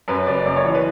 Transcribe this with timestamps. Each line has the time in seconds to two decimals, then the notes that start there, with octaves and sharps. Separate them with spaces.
0.08 F#2 B4
0.27 F#1 D5
0.46 F#2 D5
0.56 C#5
0.65 E3
0.75 B4